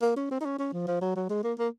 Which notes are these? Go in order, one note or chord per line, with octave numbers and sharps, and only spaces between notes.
A#3
C#4
C4
D#4
C#4
C#4
F3
F3
F#3
F#3
G#3
A#3
A#3